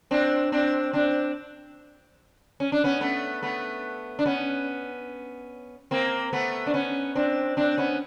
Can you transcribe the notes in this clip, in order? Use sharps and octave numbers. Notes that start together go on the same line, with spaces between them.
C4 D4
C4 D4
C4 D4
C#4
D4
B3 C#4
A3 B3
A3 B3
D4
B3 C#4
A#3 C4
A3 B3
D4
B3 C#4
C4 D4
C4 D4
B3 C#4